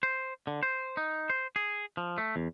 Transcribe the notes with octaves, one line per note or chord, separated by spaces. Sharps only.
C5
D3
C5
D#4
C5
G#4
F3
A3
E2